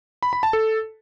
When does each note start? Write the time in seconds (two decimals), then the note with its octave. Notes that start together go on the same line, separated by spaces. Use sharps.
0.23 B5
0.33 B5
0.43 A5
0.53 A4